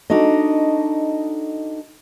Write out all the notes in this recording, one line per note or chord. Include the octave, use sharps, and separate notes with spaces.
D4 D#4 F#4 A4 D#5